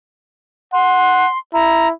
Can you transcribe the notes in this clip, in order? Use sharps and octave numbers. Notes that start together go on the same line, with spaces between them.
F#5 C6
E4 A#5